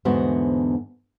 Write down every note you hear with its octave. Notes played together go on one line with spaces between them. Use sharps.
E2 G#2 D3 B3 F#4 C5